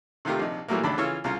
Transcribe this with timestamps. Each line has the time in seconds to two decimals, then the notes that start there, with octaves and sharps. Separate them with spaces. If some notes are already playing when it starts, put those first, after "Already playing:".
0.25 C3 D#3 A3 F4 G4 A#4
0.40 A#1 C3 D#4
0.68 A#2 E3 F#3 G3 A3 A#3
0.84 G#1 C#2 A3 D4 B5
0.98 C#3 E3 F4 C#5 C#6 E6
1.24 C2 C#3 F4 A#5